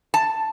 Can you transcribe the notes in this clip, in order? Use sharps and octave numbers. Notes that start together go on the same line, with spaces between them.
A5